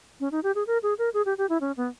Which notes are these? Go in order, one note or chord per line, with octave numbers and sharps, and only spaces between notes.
C#4
D#4
G4
G#4
A#4
G#4
A#4
G#4
G4
G4
E4
C#4
B3